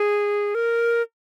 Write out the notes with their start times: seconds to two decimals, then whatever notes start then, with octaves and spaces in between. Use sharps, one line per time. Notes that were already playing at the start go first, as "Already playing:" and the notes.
Already playing: G#4
0.55 A#4